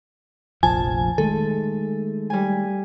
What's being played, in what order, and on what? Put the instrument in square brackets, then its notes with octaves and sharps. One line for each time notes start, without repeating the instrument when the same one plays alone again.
[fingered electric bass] F1 A#1 F3 [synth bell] G#5 [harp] A5
[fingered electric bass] D#3 G#3 A3 [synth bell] A4
[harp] G3 G#5